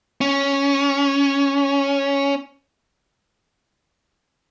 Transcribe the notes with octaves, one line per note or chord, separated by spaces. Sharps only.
C#4